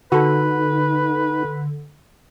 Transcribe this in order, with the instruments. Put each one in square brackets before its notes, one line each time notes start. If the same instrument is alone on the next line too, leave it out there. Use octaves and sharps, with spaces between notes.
[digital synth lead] D3 [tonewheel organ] D#4 [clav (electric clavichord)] F#4 A4 [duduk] B4